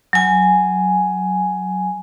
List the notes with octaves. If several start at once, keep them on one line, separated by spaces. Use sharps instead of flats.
F#3 G#5